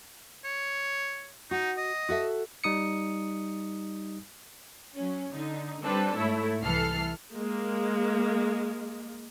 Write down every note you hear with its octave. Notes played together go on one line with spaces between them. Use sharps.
C#5
D#4 F#4
D#5
F#4 A4 E5
G3 D#4 D#6 C#7
F#3 C#4
D3 D#4
G3 C4 D4 A4 B4
G#2 A3 E4 C#5
C2 E3 A4 F6 C7
G#3 A#3